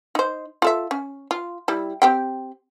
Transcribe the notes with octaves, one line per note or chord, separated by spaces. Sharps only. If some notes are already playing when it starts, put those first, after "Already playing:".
D#4 C5
F4 A4 E5
C#4
F4
G3 E4
C4 G4 G5